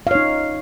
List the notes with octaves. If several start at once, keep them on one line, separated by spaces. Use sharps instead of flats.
D#4 C#5 F5